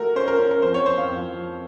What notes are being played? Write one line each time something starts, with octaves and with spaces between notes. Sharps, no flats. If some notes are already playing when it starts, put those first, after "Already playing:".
Already playing: A3 F4 F#4 A#4
C#4 C5
A#4
C#4
A#4
F2 C5
C#5
C4 C5
F5
F2
F3